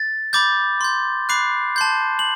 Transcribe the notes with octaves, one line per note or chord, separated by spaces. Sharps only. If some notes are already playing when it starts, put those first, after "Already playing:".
Already playing: A6
B5 D6 G6 A6
C6 G6
B5 D6 F#6 C7
A5 C6 G6
F#7